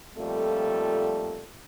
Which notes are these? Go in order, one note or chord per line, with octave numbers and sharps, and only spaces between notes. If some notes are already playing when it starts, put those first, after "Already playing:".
F2 A#2 G3 A3 A4